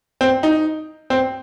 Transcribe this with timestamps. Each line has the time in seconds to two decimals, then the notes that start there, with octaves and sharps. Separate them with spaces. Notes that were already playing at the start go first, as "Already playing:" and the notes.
0.21 C4
0.43 D#4
1.10 C4